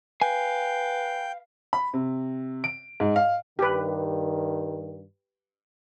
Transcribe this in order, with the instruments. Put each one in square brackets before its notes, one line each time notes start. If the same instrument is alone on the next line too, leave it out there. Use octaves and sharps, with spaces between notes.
[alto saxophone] B4 [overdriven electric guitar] F5 [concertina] G5 [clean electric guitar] G#5
[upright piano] B5
C3
D7
G#2
F5
[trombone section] G2 D#3 [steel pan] G4 B4